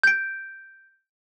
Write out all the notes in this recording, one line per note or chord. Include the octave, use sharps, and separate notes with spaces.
G6 D7